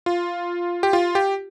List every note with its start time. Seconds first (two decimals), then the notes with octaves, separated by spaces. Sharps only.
0.06 F4
0.83 G4
0.93 F4
1.15 G4